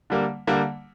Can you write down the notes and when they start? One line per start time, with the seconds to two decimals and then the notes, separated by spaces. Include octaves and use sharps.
0.10 D3 G3 A#3
0.47 D3 G3 A#3